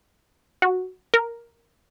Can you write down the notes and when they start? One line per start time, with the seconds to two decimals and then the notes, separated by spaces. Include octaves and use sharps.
0.62 F#4
1.14 A#4